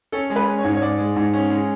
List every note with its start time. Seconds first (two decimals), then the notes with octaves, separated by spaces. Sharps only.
0.12 C#4 A4
0.30 G#3
0.36 B4
0.47 C#4
0.59 C#5
0.64 G#2
0.75 C#5
0.82 G#2 D5
0.99 G#3
1.16 G#2
1.33 C#4
1.50 G#3